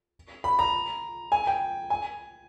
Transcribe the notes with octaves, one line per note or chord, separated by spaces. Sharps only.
B5
A#5
G#5
G5
G#5